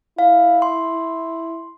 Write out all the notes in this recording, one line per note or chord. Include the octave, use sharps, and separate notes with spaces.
E4 F5
C6